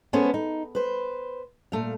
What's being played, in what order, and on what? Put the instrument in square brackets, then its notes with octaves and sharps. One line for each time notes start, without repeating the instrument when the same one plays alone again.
[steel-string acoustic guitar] G#3 A3 B3 C#4 B4 C5
D#4
B4 C5
A#2 A3 F5